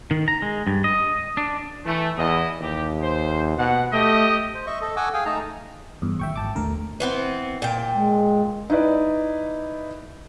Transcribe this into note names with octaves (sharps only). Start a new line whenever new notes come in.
D#3
A#5
G#3
G2
D#5
D4
E3 A3
E2 E4 D#5
D#2 G4
C5
B2 F#5
A3 G4 D#5
C5
D#5 E5 C#6
A4 D#5
A4 F#5 G#5 C#6 D6 E6
G#4 F5 G5 G#5
A3 D#4 A5 A#5
E2 G2
A#1 D#3 E5 G5 C#6
G#1 G5 A5 D6
A1 D#2 D3 A3 A#4
E3 B3 C4
A#2 G5
G#3
D#4 E4 B4 D5